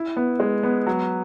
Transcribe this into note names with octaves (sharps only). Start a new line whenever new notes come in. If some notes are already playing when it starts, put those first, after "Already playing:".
Already playing: E4
B3
G#3
B3
F#3